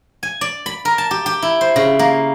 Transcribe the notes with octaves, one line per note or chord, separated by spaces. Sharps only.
G#5
D5
B5
A#4
A5
G4
G4
E4
C5
C#3
A#3